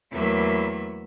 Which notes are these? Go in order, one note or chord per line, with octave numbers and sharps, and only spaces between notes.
E2 F#3 A3 A#3 E5 B5